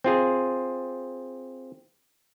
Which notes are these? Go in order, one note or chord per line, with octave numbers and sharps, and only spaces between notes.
C4 F4 G#4